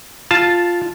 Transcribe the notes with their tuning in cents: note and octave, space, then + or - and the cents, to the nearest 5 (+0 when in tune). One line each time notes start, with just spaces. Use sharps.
F4 +0 A5 +0